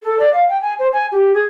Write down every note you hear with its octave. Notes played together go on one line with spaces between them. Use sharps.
A4
D5
F5
G5
G#5
C5
G#5
G4
G#4